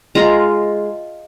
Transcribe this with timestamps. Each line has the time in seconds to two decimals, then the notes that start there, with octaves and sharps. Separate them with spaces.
0.15 G#3 F4 A#5